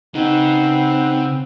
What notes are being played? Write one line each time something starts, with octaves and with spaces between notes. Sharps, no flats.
C#3 C4 D#4 B4 F#5